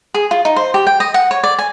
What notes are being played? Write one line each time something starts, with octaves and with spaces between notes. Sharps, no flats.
G#4
F4
D#4
C5
G4
G5
D#5
F#5
C#5
D5
G#5